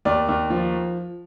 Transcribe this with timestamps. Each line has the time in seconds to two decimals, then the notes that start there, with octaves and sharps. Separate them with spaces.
0.05 D#2 D5
0.29 D#2
0.50 F3